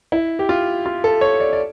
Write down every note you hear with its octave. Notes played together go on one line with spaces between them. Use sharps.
E4
G4
F4
F4
A4
C#5
D5
D5